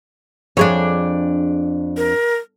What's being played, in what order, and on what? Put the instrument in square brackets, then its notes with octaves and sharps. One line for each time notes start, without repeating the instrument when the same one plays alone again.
[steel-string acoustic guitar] F2 [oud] D4 G#4 C#5
[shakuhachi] A#4